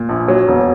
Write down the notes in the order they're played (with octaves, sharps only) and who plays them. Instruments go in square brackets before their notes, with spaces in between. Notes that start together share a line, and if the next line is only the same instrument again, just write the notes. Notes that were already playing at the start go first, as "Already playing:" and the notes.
Already playing: [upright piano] A#2
A#1
F#3
E1